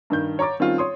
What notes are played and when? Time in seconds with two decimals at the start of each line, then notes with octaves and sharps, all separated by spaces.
0.10 G2 D#3 G6
0.39 C#5 A#5 C#6 D6 A6
0.60 D#3 G3 C4 C#4 F4
0.78 C#5 C6 D#6